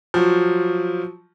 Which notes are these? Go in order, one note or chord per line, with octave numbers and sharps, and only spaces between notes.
F3 F#3